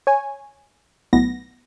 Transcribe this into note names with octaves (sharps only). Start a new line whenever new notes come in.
C#5 G#5
B1 A2 B3 A#6